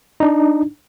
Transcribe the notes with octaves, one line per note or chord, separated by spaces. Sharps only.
D4 D#4